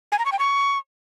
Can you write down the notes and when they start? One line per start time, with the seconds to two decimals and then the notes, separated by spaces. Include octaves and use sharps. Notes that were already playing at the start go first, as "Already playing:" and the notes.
0.12 G#5
0.19 A#5
0.26 C#6
0.32 G5
0.39 C#6